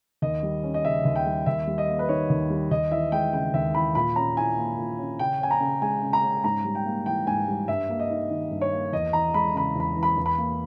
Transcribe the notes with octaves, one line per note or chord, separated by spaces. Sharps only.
D#2 D#5
G3
C#4
D#5
C#3 E5
D#2
G5
G3
D#2 E5
G3
D#5
A#3
B4
D#3 C#5
D#2
G3
D#2 D#5
E3 E5
G#3 G5
C#3 G5
D#2 E5
E3 B5
A#2 B5
C#4 A#5
E4 G#5
A#3
A#2
C#4
C#3 G5
C#4 G#5
A#5
C#3
G#3 G#5
C#3
A#5
C#4
G#2 A#5
G3
G5
A#3
E3 G5
G#2 G#5
G3
G2 E5
A#3
D#5
D#4
D#3
G2
C#5
A#3
E2 D#5
E3 A#5
G#3 B5
C#3 B5
E2 B5
E3
B5
E2
B5
A#3